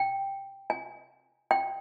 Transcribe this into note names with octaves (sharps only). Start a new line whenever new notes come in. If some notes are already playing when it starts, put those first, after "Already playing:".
Already playing: G5
G#5
G5